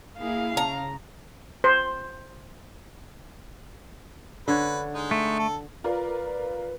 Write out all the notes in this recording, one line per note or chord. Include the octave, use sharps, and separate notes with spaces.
A#3 E4 G#4 F5
C#3 A#5
C5
D3 B4 C#5
G#3 D#4
A3
A4
F4 A#4 B4 D5